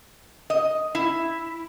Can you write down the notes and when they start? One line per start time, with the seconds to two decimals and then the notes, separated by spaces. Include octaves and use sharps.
0.50 D#5
0.95 E4